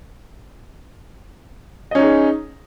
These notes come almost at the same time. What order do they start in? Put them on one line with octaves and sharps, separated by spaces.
D#5 C#4 D#4 G#4